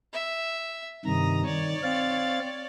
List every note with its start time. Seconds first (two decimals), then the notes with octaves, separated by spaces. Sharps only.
0.13 E5
1.05 G2 C3 D#3 A#5 D#6
1.45 D#3 C#5 D5
1.83 C4 F5 A6